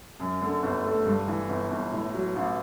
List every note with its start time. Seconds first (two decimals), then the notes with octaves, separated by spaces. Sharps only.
0.20 F#2
0.41 D3
0.63 G1
0.84 A3
1.05 G2
1.28 E3
1.49 G1
1.71 G1
1.92 A2
2.14 F#3
2.36 A1